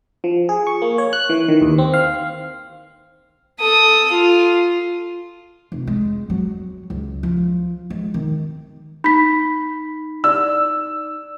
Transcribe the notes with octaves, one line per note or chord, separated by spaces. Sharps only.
F3
G#4
C#6
A#3
C#5
F#6
E3
D#3
D#2
C4
F5
A4 D#6
F4
F1
G#3
F#3
C#2
F3
G#3
D#3
D#4 B5 B6
D5 E6